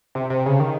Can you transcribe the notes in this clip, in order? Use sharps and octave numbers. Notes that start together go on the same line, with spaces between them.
C3
C3
C#3
D#3